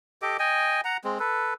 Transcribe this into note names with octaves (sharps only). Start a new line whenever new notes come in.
G4 A4 D#5 D6
D#5 G5 G#5
F#5 A#5
G#3 C4
A4 B4